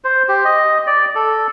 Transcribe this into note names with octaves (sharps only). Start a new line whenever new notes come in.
C5
G4
D#5
D5
A4